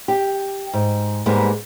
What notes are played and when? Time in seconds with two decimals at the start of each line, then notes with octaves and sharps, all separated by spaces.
0.08 G4
0.73 G#2
1.26 G#2 G3 G#3 A#3 B3 B4